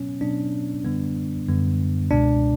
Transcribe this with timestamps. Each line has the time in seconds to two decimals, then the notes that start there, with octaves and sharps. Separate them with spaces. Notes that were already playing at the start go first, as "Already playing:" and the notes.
Already playing: B2 F#3 B3 C#4
0.21 B2 F#3 B3 D4
0.85 F#2 D3 G3 B3
1.48 F#2 D3 G3 B3
2.11 C#2 B2 G#3 D4